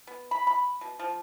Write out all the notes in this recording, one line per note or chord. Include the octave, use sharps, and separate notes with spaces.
B3
B5
B5
B2
F3